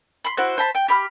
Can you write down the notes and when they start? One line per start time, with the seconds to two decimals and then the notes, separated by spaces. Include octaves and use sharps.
0.24 B5 C6
0.37 E4 F#4 C5 F#6
0.58 C5 A5 B5
0.75 G5
0.88 G4 B5 F6